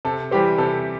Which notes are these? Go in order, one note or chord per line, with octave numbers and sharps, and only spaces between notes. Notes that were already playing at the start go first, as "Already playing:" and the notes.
C3 A4
E3 G3 C4 G4
C3 A4